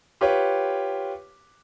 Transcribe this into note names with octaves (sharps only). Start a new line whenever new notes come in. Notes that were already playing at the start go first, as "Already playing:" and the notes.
F4 G4 B4 C#5